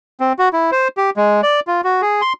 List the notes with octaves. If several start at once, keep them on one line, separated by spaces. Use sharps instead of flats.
C4
F#4
E4
C5
G4
G#3
D5
F4
F#4
G#4
C6